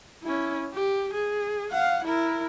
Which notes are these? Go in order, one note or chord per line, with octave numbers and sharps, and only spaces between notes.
C#4 E4
G4
G#4
F5 F#5
E4 A#4